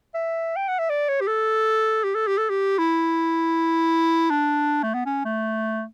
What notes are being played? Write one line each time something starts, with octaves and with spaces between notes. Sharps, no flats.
E5
G5
F#5
E5
D5
C#5
G4
A4
G4
A4
G4
A4
G4
E4
D4
A3
B3
C#4
A3